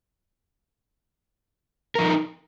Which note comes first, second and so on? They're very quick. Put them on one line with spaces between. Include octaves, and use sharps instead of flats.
A#4 F3 D#4